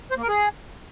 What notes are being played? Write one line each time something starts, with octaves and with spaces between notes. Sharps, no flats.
C5
A#3
A#4
G#4